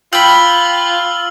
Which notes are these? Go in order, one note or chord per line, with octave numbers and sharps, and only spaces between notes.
F4 G5 B5 E6 F6 F#7